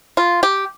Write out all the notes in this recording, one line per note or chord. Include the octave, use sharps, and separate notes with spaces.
F4
G4